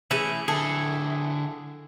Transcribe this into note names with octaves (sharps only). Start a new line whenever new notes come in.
E3 A3 C#4 E4 G#4
D3 E4 G#4 A4